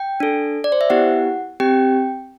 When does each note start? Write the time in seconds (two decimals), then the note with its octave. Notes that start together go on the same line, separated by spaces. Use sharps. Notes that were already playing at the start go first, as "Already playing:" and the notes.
Already playing: G5
0.20 D4 A4
0.64 D5
0.72 C5
0.81 E5
0.90 B3 E4 G4 F#5
1.60 C4 G4 G5